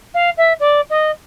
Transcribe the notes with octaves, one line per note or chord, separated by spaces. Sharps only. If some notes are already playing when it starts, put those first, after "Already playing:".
F5
E5
D5
D#5